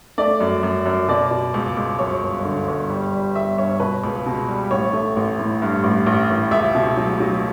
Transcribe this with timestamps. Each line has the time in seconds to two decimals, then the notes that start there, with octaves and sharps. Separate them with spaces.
0.18 A3 D5
0.41 F#2
0.63 F#2
0.86 F#2
1.08 B2 D5
1.31 B2
1.54 C#2
1.77 C#2
1.99 F#2 C#5
2.22 G1
2.45 D3
2.68 G1
2.90 G3
3.12 G3
3.35 G1 E5
3.57 G2 C#5
3.80 B2 B4
4.04 C#2
4.26 B2
4.49 G3
4.71 A1 C#5
4.93 A3
5.16 A1
5.39 A2
5.62 G2
5.84 A1
6.06 A1
6.30 A1
6.51 C#2 E5
6.75 B2
6.97 F#3
7.20 F#3